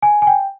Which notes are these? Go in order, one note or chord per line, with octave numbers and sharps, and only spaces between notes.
G#5
G#5
G5